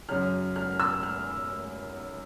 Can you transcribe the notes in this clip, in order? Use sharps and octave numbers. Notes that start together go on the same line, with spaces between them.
F#2 C#3 F#3 F6
F6
E6
F6